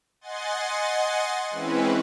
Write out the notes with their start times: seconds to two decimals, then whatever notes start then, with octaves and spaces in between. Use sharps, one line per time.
0.21 D#5 F#5 G#5 C6 A6
1.50 E3 G#3 C4 C#4 E4 B4